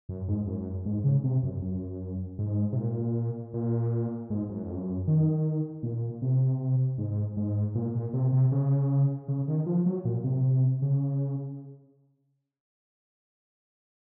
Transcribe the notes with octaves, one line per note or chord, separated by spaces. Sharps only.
F#2
G#2
F#2
G#2
C#3
C3
F#2
F#2
G#2
C3
A#2
A#2
G#2
F#2
F2
F#2
D#3
A#2
C3
G#2
G#2
A#2
A#2
C3
C3
C#3
C#3
D#3
F3
F#3
A#2
C3
C#3